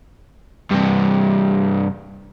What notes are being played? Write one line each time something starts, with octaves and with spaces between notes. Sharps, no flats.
G2 C3